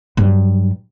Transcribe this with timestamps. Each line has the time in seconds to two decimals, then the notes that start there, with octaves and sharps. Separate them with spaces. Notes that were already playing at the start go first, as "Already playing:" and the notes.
0.17 G2 F#3